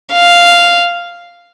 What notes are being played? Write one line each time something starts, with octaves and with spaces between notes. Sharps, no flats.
F5